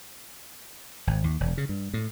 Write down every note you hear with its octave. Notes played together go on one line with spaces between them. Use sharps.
G#1
D#2
E1
C#3
G2
A2